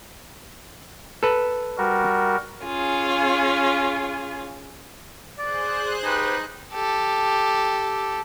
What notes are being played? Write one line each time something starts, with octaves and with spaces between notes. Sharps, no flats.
A4 B4
G3 F#4 A#4
C#4 F4 G#4
G#4 C5 D5 F#6
D#4 G4 B4
G4 A4